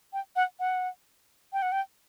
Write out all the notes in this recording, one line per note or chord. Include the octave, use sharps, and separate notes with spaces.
G5
F#5
F#5
G5
F#5
G5